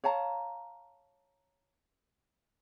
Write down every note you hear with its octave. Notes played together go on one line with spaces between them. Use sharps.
C#5 F5 A5 A#5